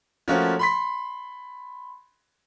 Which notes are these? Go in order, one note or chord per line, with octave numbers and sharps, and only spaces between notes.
F3 A3 A#3 C#4 F#4
B5 C6 B6